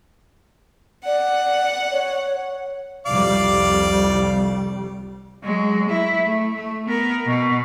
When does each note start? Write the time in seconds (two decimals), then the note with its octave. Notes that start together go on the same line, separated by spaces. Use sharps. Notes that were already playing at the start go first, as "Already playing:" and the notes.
1.06 D5 F#5
1.92 C#5
3.06 C2 F2 G3 D5 F5 D6
5.43 F#3 G#3
5.90 E4
6.25 A3
6.55 A3
6.87 B3 A#4
7.27 B2